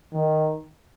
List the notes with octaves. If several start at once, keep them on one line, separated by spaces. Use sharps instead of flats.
D#3